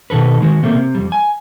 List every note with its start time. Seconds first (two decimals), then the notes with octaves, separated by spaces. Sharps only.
0.10 B2 D#3 A4 B4
0.41 D#3 G#3 F#4
0.63 C3 A3 A#3
0.75 C3
0.95 F2 G3
1.12 G#5